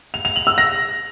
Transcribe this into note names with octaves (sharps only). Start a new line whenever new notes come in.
F7
F7
F#7
E6
A#6